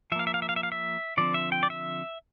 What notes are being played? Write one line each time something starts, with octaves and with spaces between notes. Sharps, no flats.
F3 A#3 E5 F5
E5
F5
E5
F5
E5
F5
E5
D3 F3 C4 D5
E5
G5
D5
E5